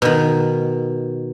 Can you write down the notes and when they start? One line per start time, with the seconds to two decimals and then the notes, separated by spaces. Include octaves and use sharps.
0.02 B2 D#3